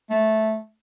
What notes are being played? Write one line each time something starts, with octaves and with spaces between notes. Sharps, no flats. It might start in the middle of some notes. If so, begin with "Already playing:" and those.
A3